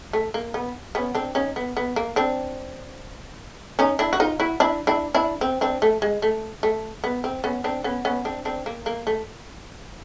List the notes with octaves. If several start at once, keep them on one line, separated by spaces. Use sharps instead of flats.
A3
A#3
B3
B3 C#4
C4 D4
C#4 D#4
B3
B3
A#3
C4 D4
C#4 D#4
D4 E4
F#4
D#4 F4
E4 F#4
D4 E4
D4 E4
D4 E4
C4
C4 D4
A3
G#3
A3
A3
B3
C4
B3 C#4
C4 D4
B3 C#4
B3 C#4
C4 D4
C4 D4
A#3
A#3
A3